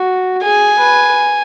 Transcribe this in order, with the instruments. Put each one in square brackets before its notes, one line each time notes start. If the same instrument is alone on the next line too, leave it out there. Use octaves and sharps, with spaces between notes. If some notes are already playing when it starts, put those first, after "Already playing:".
Already playing: [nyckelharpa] F#4
[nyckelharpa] G#4 [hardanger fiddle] G#5
[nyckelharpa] B4